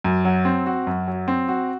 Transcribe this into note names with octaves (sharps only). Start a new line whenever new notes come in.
F#2
F#3
C4
F#4
F#2
F#3
C4
F#4